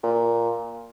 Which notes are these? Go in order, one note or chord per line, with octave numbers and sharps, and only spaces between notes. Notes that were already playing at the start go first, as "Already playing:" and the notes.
A#2